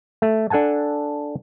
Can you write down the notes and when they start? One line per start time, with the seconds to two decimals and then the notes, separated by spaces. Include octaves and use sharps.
0.22 A3
0.50 D4 A4 F#5 G#5 A5